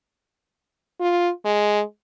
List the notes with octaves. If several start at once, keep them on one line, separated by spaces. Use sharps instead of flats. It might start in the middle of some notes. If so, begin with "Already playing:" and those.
F4
G#3